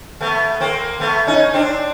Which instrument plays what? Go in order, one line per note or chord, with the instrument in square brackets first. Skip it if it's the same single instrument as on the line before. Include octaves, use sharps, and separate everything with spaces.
[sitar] A3 B3
A#3 C4
A3 B3
C#4 D#4
C4 D4